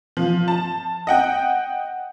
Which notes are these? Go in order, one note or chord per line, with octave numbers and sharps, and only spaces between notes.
F3
A5
D#5 F#5 G5